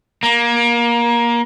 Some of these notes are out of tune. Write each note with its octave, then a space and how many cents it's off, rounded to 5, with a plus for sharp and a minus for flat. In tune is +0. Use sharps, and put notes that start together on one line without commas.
A#3 +20